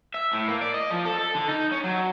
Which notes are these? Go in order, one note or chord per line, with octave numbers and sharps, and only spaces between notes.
E5
A2
A#3
D5
D#5
F3
A4
A4
D3
D#4
C#4
F#3